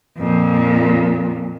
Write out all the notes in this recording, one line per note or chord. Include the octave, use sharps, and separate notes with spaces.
F2 A#2